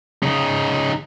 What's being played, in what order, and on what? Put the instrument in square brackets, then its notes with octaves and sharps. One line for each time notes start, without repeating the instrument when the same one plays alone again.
[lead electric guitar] C#3 D#4